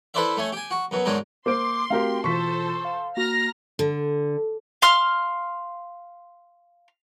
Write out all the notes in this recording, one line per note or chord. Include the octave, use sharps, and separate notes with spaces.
E4 A4 B4 C5 D5 E5
A3 C#4 G#5
G4 G#5
F#4
F#2 B2 F#3
G#2 D#3 F#3 G#3 D4 G4
A#3 C5 C6 D6 D7
A3 C4 F#4 G4 A#4 F5 G5
B2 E3 F4 A4 C5 C6 C#6 B6
F5
A#3 F#4 A#5 F6 A#6
D3
F5 C6 F6